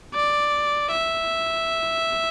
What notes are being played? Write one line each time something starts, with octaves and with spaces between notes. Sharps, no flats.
D5
E5